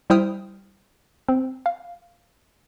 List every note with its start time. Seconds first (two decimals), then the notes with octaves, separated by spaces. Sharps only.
0.10 G3 E4 C5 G5 D#6 F6
1.28 C4
1.66 F5